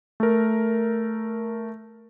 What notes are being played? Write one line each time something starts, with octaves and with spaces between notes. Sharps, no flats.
A3 A#4